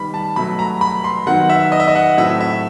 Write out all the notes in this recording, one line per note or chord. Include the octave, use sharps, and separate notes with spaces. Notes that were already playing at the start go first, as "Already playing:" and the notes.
Already playing: D#3 G3 B3 B5
A5
B2 F#3 A3 B5
A#5
B5
C6
D#3 F#3 B3 F#5
E5
D#5
E5
D#5
F#5
A2 F#3 A3 C4 E5
E5